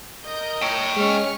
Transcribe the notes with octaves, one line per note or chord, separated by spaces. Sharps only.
A#4 D#5 G6
C#5 G5
G#3 C#4 C#6 F6